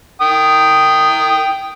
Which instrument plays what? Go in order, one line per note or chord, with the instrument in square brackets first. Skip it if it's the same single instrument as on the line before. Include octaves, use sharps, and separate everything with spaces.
[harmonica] G5 D#6